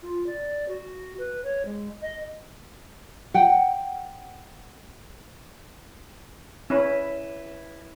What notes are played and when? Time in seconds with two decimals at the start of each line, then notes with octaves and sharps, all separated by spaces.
0.02 F4
0.26 D5
0.68 F#4
1.18 B4
1.44 C#5
1.65 G#3
2.02 D#5
3.34 F#5 G5
6.70 C#4 E4 B4